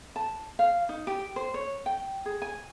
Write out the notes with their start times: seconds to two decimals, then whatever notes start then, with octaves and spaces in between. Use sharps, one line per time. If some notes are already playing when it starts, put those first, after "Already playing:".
0.16 A5
0.59 F5
0.89 D#4
1.07 G4
1.36 C5
1.54 C#5
1.86 G5
2.26 G#4
2.42 G#5